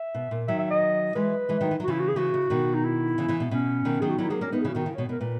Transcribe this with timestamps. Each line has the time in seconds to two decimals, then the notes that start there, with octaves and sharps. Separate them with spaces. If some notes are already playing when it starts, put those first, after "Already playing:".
Already playing: E5
0.14 B2
0.31 A#2
0.48 D#3 F#3 E5
0.59 E5
0.70 D#5
1.15 E3 G#3 B4
1.49 E3 G#3
1.61 D#3 F#3
1.71 E3
1.80 F#3
1.84 F#4
1.88 C#3 E3 E4
2.00 F#4
2.08 G#4
2.16 C#3 E3 F#4
2.34 C#3
2.50 B2 D#3
2.75 D#4
2.84 E4
3.18 C#3 E3
3.28 C#3 E3
3.40 B2
3.51 B2 C#4
3.85 B2 D#3
4.01 D#3 F#3 G#4
4.10 F#4
4.18 D#3 F#3 E4
4.30 F#3 A#3 G#4
4.41 A#3 C#4 A#4
4.52 B3 D#4 B4
4.61 G#4
4.64 C#3 E3 F#4
4.75 B2 D#3 F#4
4.86 C#3 E4
4.95 C#5
4.98 B2
5.09 B2 A#4
5.20 A#2 B4